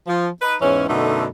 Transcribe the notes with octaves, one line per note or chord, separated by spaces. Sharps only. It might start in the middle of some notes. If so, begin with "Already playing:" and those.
F3
D#4 B4
E2 G#2 E3 C#4
F#2 B2 D3 A3 D#4